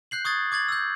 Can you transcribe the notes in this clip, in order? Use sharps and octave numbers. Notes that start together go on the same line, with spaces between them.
F#6 G6 C7 F#7
C#6 D#6 G#6 A6
D6 G#6 A6 F#7
E6 G6